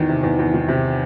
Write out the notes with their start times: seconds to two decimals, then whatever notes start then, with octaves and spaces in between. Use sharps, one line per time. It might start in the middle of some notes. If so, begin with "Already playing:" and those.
Already playing: E2 D#3
0.09 C3
0.23 E2
0.39 E2
0.54 D#3
0.68 C3